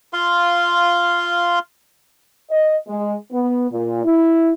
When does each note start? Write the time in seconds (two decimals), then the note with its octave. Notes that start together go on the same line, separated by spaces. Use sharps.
0.13 F4 F5 C6
2.51 D#5
2.88 G#3
3.31 B3
3.71 A#2
4.05 E4